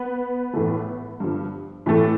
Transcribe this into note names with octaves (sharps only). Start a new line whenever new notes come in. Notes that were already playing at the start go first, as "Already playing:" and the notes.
Already playing: B3 B4
A2 E3 A3
G2 D3 F3
A2 E3 A3